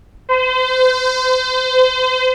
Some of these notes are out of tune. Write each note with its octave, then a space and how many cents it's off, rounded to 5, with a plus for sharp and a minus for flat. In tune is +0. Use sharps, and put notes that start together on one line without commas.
C5 -35